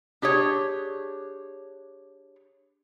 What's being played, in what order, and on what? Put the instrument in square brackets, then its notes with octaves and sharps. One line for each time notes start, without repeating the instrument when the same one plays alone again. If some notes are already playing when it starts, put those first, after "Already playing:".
[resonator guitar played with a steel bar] D4 G4 G#4 C#5